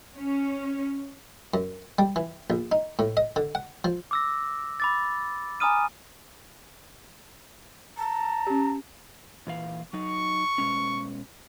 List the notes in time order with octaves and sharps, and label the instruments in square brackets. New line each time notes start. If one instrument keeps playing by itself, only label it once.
[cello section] C#4
[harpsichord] F#2
G3
E3
A#1
D#4
A2
D#5
D3
F#5
F3
[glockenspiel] D6 E6 A#6
B5 D6 A6
G#5 A#5 B5 D#6 F6 D#7
[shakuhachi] A5 [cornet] A#5
[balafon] C#4 G4
[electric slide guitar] A#2 E3 F5
[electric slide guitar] F#3 D#4 [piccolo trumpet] C#6
[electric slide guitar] B2 G#3 C#4